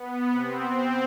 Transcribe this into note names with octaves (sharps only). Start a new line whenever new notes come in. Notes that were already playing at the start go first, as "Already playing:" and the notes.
Already playing: B3
C3 C4